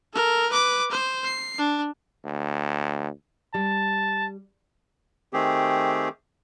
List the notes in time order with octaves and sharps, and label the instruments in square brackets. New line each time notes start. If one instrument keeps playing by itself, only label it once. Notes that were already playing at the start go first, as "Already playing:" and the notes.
[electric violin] A4 A#4
B4 D6
C5
C7
D4
[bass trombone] D2
[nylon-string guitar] G3 [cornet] A5
[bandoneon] D#3 A3 C4 G4 G#4